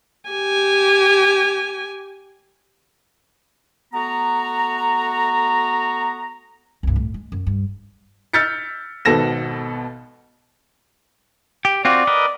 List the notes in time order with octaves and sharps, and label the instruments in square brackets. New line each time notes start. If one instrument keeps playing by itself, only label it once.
[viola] G4 G#5
[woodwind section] A3 B3 F#4 A#5
[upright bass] C2 G2
A2
G#3
F#2
G2
[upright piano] E6 F6 G6 A6 B6 C#7
G#1 B2 B3 A4 A#6 E7
[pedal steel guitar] G4
[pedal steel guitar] C4 F4 F#4 [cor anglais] D5
[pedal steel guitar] A#4 B4 D#5